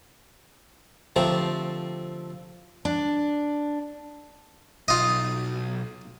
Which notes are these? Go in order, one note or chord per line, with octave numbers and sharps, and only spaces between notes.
D3 F3 A3 C4 G4 A#5
D4
B1 F4 D#5